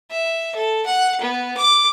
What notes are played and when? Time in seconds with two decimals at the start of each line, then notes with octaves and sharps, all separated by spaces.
0.11 E5
0.55 A4
0.86 F#5
1.21 B3
1.57 D6